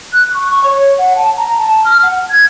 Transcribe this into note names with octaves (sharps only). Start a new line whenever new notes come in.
F#6
C#6
C#6
C#5
F#5
A5
A#5
A5
F6
F#5
G#6